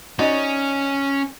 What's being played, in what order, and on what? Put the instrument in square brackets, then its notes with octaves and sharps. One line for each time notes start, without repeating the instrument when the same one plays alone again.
[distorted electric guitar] C#4 [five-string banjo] D#4 F#4 D5